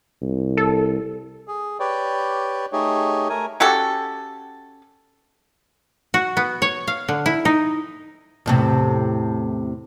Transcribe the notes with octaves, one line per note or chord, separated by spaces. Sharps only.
C2
A4
G#4
G4 B4 C#5 D5 G5
A3 D#4 G4 G#4 C#5
A3 A#4 G#5
C#4 F#4 G4 A4
F#4
B3
C#5
F5
D3
E4
D#4
E2 A2 C3